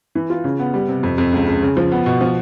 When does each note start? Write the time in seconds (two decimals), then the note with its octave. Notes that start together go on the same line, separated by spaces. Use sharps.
0.15 E3
0.30 F4
0.44 C#3
0.59 B3
0.74 G3
0.88 C3
1.03 F2
1.18 F2
1.33 C#2
1.47 C#2
1.62 C#3
1.77 F3
1.91 B3
2.06 B2
2.21 F3